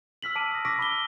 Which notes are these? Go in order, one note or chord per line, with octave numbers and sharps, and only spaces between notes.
E6 F6 B6 F#7
A5 D6 D7 D#7
D#6 A#6
C#6 D6 E6 A#6 B6 D7
B5 D6 G7
E6